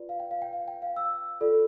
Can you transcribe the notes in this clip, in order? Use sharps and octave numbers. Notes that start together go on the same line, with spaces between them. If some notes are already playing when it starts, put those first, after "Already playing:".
Already playing: F4 B4 D5
F5
G5
F5
G5
F5
G5
F5
E6
F4 A4 D5